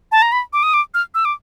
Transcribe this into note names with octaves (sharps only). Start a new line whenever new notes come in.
A5
A#5
B5
D6
D#6
D6
F6
E6
D6